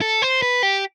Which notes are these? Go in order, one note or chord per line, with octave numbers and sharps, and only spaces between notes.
A4
C5
B4
G4